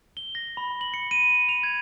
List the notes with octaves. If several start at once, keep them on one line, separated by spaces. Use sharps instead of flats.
G7
A#6
B5
F#7
C#7
D#7
F7
G#6